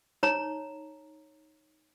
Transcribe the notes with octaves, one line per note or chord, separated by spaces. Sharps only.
D#4 C#5 A#5